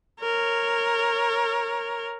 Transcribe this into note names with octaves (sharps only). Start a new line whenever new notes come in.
A#4 C#5